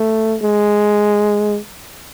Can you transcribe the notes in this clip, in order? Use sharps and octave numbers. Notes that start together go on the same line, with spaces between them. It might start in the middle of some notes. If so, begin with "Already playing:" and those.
Already playing: A3
G#3